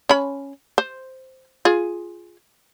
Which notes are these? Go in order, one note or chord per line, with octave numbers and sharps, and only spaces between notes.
C#4 B5
C5
F4 G#4